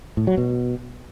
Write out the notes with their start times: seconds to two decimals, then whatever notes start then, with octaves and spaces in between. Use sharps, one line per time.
0.17 A2
0.27 F#3
0.37 B2